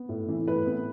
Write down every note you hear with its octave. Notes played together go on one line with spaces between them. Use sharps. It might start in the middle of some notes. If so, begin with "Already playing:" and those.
Already playing: B3
A2
E3
A2 B4
B3